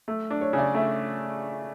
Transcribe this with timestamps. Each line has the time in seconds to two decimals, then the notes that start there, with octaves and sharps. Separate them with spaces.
0.08 A3
0.30 D4
0.41 C#5
0.53 C#3 D5
0.75 A3 E5